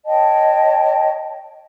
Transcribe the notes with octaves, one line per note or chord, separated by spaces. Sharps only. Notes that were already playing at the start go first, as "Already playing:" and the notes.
C#5 D#5 G5 A5